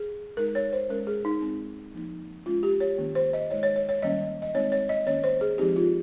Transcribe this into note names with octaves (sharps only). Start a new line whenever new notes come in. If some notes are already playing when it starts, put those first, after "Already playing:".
Already playing: G#4
G#3 D#4 A#4
C#5
C5
G#3 C#4 A#4
G#4
D#4
G#3 C4 D#4
F3 A#3 D#4
G#3 C#4 F4
G4
C#5
D#3 A#3 C#4
C5
D#5
G#3 D#4 C#5
C#5
C#5
C#5
D#3 G3 A#3 C#4 D#5
D#5
G#3 C4 D#4 C#5
C#5
D#5
D#3 A#3 C#4 C#5
C5
G#4
F3 G#3 C4 D#4 G4
F4